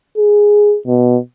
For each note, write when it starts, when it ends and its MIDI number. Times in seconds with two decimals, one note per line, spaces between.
0.18 0.77 68
0.87 1.18 47